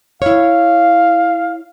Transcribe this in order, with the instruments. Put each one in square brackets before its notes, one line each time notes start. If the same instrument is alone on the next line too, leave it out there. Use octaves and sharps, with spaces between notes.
[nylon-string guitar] E4 C#5 [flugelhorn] F5